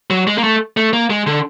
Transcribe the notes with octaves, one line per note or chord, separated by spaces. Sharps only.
F#3
G#3
A#3
A3
A3
A#3
G#3
D3